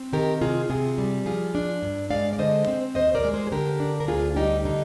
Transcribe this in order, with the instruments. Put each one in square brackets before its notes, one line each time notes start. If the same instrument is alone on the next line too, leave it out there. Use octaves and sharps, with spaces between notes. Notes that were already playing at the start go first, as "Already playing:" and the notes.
Already playing: [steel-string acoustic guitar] C4
D#3 G4 A#4
C3 F4 G#4
C3 F4 G#4
G3
F3 F4 G#4
D4
G2
G#3 D5 F5
D5
D3 C5 D#5
C4
D#2 C5 D#5
A#4 D5
G#3
G#4 C5
G#4
D3 G4 A#4
D4
A#4
D2 F4 G#4
G3 D#4 G4
D3 D#4